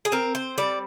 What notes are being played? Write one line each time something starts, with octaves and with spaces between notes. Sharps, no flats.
G#4
C4 A#4
C5
G3 D5